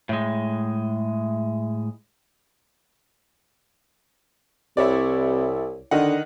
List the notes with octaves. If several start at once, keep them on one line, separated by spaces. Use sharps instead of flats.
A2 G#3
C2 C3 E4 C#5 D5
D3 D#3 D#5 F#5